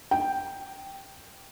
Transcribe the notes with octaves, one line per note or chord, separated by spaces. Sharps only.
G5